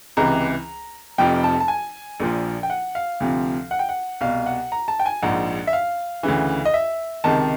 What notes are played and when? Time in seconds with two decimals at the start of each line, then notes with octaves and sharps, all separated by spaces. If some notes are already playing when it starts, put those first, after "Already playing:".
0.17 C#2 C3 E3 A#5
1.18 F1 F2 C3 F3 G5
1.44 A5
1.60 A5
1.68 G#5
2.20 A#1 A#2 F3
2.63 G5
2.70 F#5
2.95 F5
3.20 D2 C3 F3
3.71 F#5
3.79 G5
3.89 F#5
4.21 C2 B2 F5
4.46 F#5
4.72 A#5
4.88 A5
5.00 G5
5.06 G#5
5.22 A#1 G#2 F3 F#5
5.67 E5
5.73 F5
6.23 D2 C#3 E3
6.65 D#5
6.74 E5
7.24 C#2 C3 D#3 A5